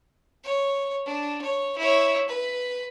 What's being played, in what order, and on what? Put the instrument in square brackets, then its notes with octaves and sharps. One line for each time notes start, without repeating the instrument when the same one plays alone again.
[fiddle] C#5
D4
C#5
E4 C#5
B4